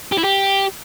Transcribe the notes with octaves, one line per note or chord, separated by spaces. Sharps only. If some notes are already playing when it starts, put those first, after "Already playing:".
G4
E4
G4